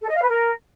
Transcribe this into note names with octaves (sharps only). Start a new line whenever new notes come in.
A4
D#5
F5
B4
A#4